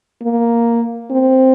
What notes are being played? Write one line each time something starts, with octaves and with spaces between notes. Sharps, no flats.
A#3
C4